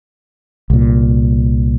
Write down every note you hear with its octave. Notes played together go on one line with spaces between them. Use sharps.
C2 A#2